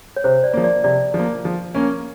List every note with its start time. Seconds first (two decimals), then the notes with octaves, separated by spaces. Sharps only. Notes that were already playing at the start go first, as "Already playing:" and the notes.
0.16 C#5
0.24 C3 C5
0.44 D5
0.53 F3 A#3
0.64 D5
0.84 C3 D5
1.14 F3
1.19 A#3
1.45 F3
1.75 A#3 C#4